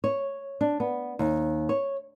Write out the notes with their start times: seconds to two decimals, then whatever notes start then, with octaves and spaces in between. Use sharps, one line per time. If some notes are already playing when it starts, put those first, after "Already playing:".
0.04 C#5
0.61 D4
0.80 B3
1.19 D#2
1.69 C#5